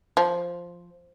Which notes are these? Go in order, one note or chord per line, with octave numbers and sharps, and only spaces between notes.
F3